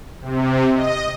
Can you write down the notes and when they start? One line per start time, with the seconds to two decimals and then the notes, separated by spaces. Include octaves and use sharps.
0.21 C3
0.74 D#5